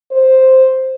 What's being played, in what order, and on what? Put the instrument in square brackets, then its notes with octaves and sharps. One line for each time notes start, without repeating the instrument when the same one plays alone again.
[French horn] C5